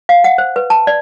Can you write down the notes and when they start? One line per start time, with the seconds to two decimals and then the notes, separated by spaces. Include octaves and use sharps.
0.09 F5
0.24 F#5
0.38 C5
0.56 B4
0.70 A5
0.87 D5